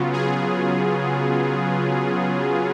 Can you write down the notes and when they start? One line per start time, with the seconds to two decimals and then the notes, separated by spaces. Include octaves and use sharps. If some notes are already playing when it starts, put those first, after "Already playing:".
Already playing: C#3 F#3 B3 F4
0.13 G#4